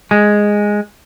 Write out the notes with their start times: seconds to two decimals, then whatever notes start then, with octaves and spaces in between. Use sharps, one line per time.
0.11 G#3